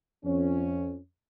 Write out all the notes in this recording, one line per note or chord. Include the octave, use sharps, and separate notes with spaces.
F2 C#4